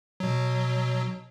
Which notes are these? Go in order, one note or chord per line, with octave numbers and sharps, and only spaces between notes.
B2 F#3